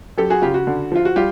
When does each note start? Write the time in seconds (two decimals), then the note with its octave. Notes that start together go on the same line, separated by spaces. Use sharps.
0.18 F#2 G4 A4
0.30 F#4 G#4
0.42 C#3 F4 G4
0.54 F#4
0.67 D3
0.92 F3 F4
1.05 F#4
1.16 G3 F4 G4